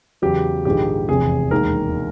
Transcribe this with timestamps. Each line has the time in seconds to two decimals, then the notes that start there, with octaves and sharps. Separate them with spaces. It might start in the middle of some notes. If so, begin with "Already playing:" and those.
0.22 E2 C#3 F#3 G4
0.65 A#1 G#2 D#3 G#3 G4
1.09 F1 E2 C3 G#4
1.51 E1 D#2 D#3 G#3 A#4